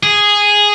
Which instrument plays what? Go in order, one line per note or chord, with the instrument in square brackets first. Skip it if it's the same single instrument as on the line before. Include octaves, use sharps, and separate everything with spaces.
[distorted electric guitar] G#4